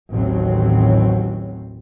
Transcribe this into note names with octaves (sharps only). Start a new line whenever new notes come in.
A1 D#2 A2 F#3 C4